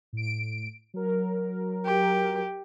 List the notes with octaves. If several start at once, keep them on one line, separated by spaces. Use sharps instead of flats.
A2 D7
F#3 A#4
G4